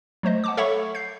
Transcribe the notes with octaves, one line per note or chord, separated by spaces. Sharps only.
F#3 A3 C5 D#5
F#5 A5 D6
A4 C#5 E5 F#5 B5 C#6
G6 C7